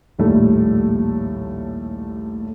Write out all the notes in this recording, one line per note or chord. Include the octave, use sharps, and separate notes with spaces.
A#1 D#2 A2 G3 A3